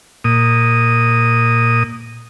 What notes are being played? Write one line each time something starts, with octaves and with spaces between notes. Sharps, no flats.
A#2 D#6